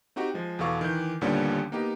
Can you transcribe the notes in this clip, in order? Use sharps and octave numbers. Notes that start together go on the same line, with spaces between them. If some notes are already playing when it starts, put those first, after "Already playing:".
C4 D#4 F#4 G4
F3 G#3
E2 B2 A4 F5 C#6 D6
D#3 E3 G6
D#2 A#2 D3 G3 B3 C#4
A#3 B3 D#4 G4